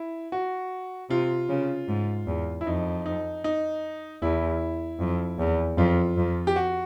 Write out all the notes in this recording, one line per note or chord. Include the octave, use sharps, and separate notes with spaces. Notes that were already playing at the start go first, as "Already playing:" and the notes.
Already playing: E4
F#4
C3 F4
C#3
G#2
E2
E4
F2 D#4
D#4
D#4
E2 E4
F2
E2
F2 F4
F2
G4
F#4